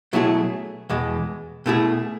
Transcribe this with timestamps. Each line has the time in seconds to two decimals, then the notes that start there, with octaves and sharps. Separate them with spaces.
0.13 B2 F#3 A3 E4 G#4
0.90 E2 B2 G#3
1.66 B2 A3 E4 G#4